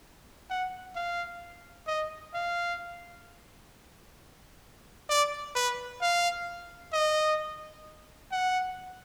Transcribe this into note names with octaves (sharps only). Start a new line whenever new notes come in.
F#5
F5
D#5
F5
D5
B4
F5
D#5
F#5